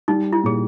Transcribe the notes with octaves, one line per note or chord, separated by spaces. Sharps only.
G3 D#4
E4
A#2 G#4